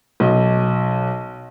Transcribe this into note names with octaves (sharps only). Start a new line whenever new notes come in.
B1 D#5